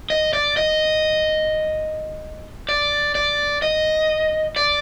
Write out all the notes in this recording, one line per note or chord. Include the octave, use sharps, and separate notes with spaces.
D#5
D5
D#5
D5
D5
D#5
D5